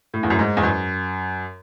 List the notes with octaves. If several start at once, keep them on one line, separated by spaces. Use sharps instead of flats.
A2
E2
F#2
G#2
E2
F#2